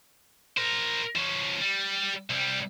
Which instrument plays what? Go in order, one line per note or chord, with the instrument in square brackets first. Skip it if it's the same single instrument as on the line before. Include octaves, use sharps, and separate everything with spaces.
[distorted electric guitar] A#4 C5
F3 C#4
G3
C2 G3